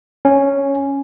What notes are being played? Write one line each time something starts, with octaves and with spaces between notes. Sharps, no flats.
C#4